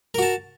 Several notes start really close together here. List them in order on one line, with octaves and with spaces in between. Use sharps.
A#4 F#4 A5